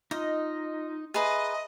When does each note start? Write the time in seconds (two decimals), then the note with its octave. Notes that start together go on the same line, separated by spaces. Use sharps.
0.11 D#4 F4 D#5 C6
1.14 G#4 B4 D#5 E5 A#5 C6